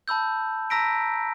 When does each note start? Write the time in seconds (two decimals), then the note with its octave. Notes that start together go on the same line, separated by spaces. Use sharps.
0.08 A5 B5 E6 G6
0.70 A5 A#5 E6 A#6 B6 D7